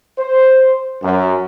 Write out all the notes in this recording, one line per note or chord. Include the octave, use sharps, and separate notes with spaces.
C5
F#2